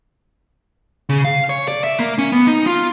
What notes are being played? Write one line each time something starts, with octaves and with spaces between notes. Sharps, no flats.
C#3
F5
C#5
D5
E5
A#3
C#4
B3
D#4
F4